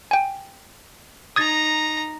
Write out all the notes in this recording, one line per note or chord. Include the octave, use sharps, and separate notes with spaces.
G5 G#5
D#4 A#5 D#6 G#6 A6